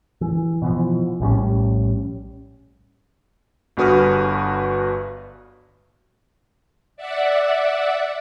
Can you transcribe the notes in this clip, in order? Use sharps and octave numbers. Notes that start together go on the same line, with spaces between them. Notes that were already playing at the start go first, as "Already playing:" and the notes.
E3
B2 E3 F3
A#1 A2 G3 C#4
G1 G2 F#4 B4 D#6 F6
D5 E5 F#5